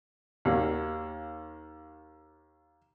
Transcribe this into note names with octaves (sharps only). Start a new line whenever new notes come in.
D#2 A#3